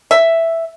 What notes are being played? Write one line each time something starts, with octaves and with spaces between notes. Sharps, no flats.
E5